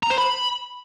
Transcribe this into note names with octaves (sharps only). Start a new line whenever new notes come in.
A#5
C5
B5